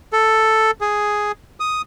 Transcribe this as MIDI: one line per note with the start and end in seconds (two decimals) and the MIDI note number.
0.13 0.71 69
0.81 1.32 68
1.60 1.82 87